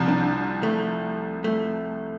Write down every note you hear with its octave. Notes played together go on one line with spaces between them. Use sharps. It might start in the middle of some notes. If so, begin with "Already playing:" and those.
Already playing: C2 C3 F3
D4
A3
A3